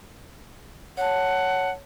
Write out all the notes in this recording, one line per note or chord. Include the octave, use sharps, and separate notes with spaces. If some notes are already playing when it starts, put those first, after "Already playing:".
C#5 F#5 A5